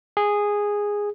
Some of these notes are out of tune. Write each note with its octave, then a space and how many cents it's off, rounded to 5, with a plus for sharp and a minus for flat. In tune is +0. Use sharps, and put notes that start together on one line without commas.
G#4 -10